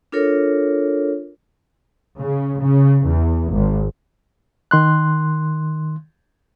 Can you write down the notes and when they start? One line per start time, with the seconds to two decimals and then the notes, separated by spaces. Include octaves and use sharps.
0.12 D4 F4 A4 A#4 C#5
2.20 C#3
2.61 C#3
3.06 E2
3.53 G#1
4.71 D#3 C6 F#6